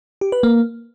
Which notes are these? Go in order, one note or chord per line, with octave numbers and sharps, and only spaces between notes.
G4
B4
A#3